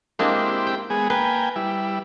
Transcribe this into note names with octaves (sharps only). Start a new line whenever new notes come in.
G#3 A#3 C4 D4 E4 G4
G5
G#3 B3 G#4
A#3 B4 G5 G#5
G3 E4